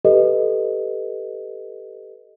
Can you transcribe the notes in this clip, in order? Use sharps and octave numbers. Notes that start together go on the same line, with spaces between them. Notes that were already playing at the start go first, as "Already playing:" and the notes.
G4 A4 B4 D#5